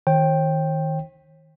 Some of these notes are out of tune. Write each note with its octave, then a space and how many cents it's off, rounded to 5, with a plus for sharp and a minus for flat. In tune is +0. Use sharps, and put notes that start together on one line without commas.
D#3 +15 C#5 -45 G5 +0